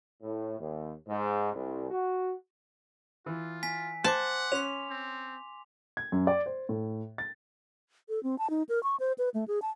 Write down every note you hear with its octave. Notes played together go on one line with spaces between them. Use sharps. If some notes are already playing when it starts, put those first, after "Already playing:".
A2
D#2
G#2
C2
F#4
E3 F4
G#5 B6
C5 F#5 A5 C6 D6
C#4 C6 F7
C4
G#6
F#2
D5
C5
A2
A6
A4
C4
A5
D#4
A#4
C#6
C5
B4
A3
G#4
A5